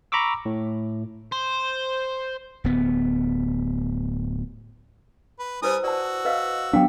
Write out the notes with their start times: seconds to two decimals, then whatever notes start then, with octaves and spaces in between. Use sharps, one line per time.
0.12 A#5 B5 C#6 D6 E6
0.46 A2
1.32 C5
2.64 D1 B3
5.39 B4
5.62 G3 E4 B4 C5 G#5 D#6
5.84 F#4 D5 A5 E6
6.25 B4 D#5 F5
6.73 F#3 B3 D4 F5 G5